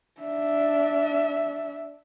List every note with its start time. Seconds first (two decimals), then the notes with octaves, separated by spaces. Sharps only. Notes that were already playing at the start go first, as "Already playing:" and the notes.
0.21 D4 E5